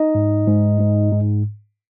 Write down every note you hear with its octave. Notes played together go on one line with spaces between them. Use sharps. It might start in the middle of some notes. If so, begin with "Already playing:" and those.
Already playing: D#4 D#5
G#2
G#2
G#2
G#2